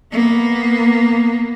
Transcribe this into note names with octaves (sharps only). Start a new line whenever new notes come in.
A#3 B3